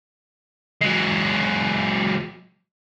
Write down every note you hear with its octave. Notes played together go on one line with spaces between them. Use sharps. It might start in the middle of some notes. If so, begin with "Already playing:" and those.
F#3 G#3